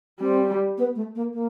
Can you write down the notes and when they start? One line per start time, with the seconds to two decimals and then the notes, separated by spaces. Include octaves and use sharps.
0.20 G3 C4
0.78 B3
0.95 A3
1.15 A#3
1.34 A#3